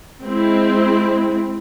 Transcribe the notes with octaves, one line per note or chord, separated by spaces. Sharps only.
G#3 C4 E4